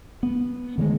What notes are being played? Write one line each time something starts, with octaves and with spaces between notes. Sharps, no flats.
B3
D3 D#3 G3 G#3